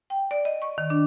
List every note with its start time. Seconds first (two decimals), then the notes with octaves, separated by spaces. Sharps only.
0.10 G5
0.31 D5
0.45 D#5
0.62 C#6
0.78 D#3
0.90 D4